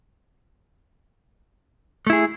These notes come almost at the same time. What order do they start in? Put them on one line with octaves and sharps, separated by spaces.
A3 E4 G#4